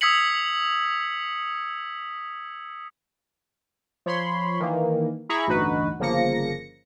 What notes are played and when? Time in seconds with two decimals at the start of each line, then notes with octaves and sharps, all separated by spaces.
0.01 D#6 E6 G#6 B6 C#7 F#7
4.06 F3 C#5 B5 C6
4.60 D#3 E3 A#3
5.29 E4 G#4 A#5 B5 C#6
5.47 A1 D2 G2 D#4 F#4 B4
6.00 G1 C#3 F3 A#3 A#6 C#7